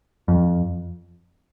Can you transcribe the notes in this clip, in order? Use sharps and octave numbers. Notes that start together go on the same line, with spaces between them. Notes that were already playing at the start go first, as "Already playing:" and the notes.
F2